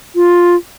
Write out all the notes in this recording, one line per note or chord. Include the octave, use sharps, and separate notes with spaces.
F4